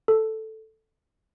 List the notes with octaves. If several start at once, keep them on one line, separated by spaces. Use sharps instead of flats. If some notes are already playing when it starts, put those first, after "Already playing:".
A4